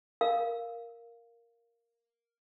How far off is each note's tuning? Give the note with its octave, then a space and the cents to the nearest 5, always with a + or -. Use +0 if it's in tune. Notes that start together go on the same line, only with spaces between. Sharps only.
A#4 +0 F5 +0